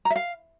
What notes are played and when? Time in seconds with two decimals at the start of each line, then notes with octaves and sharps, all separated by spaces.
0.05 A#5
0.10 E5
0.16 F5